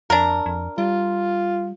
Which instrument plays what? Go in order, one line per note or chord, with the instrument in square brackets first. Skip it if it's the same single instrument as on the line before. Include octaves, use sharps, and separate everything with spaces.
[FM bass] F2 [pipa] D4 A#4
[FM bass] F2
[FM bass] G3 [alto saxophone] F4